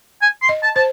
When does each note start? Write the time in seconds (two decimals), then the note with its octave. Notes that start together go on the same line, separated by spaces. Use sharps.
0.22 G#5
0.42 C6
0.49 D#5
0.63 A5
0.76 C5 A5